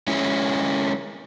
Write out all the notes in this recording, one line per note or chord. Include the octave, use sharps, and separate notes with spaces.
G#3 C#4 E4